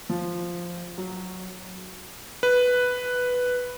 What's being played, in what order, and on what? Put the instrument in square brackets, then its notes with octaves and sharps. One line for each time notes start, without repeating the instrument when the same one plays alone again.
[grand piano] F3
F#3
[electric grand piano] B4